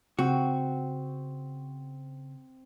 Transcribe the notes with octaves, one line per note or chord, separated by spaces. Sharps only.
C#3 C4 F#4